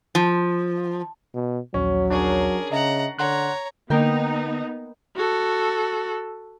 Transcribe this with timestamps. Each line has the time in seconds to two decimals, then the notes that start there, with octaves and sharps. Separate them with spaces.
0.15 F3
1.34 B2
1.74 A#1 D#2 F#3 C#4
2.10 C#4 D4 G#4 A#4
2.72 C#3 D#5 E5 F#5 A#5
3.19 D3 C#5 F#5 A#5 C6 F#6
3.90 D3 A#3 B3 D#4 A#4 G5
5.17 F#4 A4